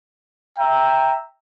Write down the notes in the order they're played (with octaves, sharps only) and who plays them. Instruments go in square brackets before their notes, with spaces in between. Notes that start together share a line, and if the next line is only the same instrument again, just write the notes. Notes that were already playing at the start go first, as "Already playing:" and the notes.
[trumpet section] E5 G5 A#5